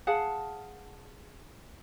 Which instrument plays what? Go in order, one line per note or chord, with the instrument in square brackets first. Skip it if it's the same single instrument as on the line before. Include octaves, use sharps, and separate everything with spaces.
[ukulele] G#4 F5 F#5 A5